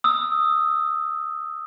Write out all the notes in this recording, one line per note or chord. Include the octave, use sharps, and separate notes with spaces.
D#6 E6